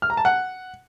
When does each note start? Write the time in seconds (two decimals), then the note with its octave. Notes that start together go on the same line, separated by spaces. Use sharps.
0.02 F6
0.10 A#5
0.17 A5
0.25 F#5